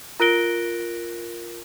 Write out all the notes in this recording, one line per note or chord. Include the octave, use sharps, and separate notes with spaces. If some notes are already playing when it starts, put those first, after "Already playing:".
F4 A#4 F#6 A#6 D7 G7